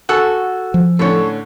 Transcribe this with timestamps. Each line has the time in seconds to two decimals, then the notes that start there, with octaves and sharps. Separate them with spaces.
0.09 F#4 A4 G#5 E6 F#7
0.74 F3
0.99 A2 D3 C#4 A4 C#5